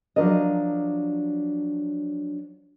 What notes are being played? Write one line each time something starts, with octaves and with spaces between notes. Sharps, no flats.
F3 F#3 D4 A#4 D#5